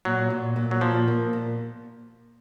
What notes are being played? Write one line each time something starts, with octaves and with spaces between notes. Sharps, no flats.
A#2 F#3
A#2
A#2
F#3
A#2 F3
A#3
A#2